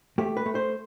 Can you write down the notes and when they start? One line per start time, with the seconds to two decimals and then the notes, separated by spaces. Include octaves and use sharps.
0.18 A3 G4
0.37 B4
0.46 A3
0.55 C5